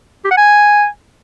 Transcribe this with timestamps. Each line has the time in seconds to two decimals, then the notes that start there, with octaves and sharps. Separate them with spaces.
0.24 G4
0.31 F#5
0.37 G#5